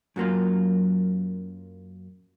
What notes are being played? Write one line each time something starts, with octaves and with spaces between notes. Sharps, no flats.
F#2 F#3 A#3 F4